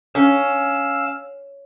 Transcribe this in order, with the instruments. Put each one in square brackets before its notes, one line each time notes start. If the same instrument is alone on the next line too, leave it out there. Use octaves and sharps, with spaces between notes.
[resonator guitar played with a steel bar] C#4 [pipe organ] F5 E6